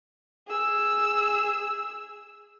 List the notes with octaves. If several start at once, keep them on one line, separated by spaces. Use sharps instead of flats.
G#4 E6